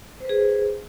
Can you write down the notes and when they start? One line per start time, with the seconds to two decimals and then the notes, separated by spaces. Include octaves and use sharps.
0.20 C5
0.25 B4
0.29 G#4